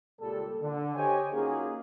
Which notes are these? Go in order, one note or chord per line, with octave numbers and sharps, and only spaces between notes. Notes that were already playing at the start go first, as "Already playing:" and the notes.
C#2 A#2 G3 A4
D3
G4 C5 C#5 D#5 G5 G#5
A#3 C#4 D#4 F4 F#4 G#4